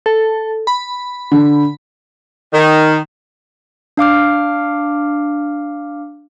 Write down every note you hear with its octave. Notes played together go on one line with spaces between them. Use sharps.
A4
B5
D3
D#3
D4 F5 D6 F6